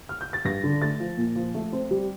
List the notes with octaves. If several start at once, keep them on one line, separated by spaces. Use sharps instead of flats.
F6
G6
A6
G2 A#6
D3
A3 A6
F3
A#2
F3
A3
C4
G3